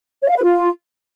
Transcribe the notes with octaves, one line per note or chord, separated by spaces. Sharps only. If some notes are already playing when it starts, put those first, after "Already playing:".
C#5
F5
B4
F4